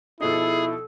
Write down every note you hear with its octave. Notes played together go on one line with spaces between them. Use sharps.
B2 F3 D#4 E4 G#4 A4